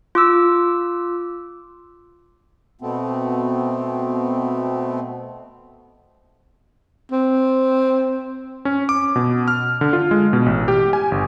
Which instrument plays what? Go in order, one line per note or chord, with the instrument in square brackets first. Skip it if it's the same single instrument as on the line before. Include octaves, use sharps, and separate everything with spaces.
[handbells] F4 D6 E6
[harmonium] B2 A3 B3 C4
[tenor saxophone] C4
[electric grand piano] C#4
D6
B2
F6
D3
F4
G#3
B2
A1
G4
G#5
G1